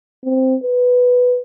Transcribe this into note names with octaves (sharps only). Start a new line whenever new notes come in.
C4
B4